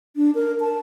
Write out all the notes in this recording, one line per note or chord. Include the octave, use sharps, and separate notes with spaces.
D4
A#4
A5